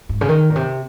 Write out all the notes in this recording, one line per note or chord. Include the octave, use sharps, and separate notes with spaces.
G#2
C#3
D#3
A#2
C3